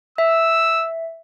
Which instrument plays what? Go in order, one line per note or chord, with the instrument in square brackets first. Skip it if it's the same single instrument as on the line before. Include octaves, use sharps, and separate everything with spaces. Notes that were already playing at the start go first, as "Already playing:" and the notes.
[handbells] E5 [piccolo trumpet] E6